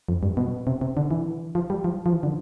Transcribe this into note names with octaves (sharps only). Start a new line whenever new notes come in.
F2
G2
B2
C3
C3
D3
E3
F3
G3
F3
F3
E3
D3